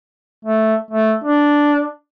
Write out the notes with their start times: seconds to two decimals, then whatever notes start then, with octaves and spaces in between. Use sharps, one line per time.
0.45 A3
0.91 A3
1.24 D4